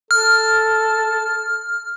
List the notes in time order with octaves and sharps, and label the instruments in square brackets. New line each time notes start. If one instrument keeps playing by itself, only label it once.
[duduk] A4 [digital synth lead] F6